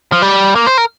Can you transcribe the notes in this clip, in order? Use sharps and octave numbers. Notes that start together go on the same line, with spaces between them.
F3
G3
A#3
C5
A#4